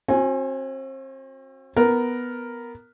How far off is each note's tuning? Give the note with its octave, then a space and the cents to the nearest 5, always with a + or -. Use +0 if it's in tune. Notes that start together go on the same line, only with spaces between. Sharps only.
C4 +35 F#4 -20 G#5 +0
B3 +0 A#4 +0